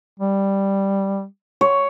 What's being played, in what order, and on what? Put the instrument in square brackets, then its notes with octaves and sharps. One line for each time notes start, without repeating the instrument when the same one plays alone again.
[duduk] G3
[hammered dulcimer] C#5